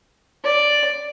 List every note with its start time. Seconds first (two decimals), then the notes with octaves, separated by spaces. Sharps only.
0.44 D5